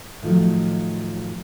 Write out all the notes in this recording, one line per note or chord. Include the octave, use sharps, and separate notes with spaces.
A2 D#3 F3 F#3